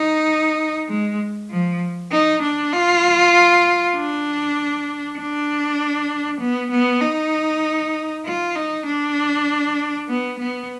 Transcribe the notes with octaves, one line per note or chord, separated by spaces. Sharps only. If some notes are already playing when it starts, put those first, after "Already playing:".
Already playing: D#4
G#3
F3
D#4
D4
F4
D4
D4
B3
B3
D#4
F4
D#4
D4
B3
B3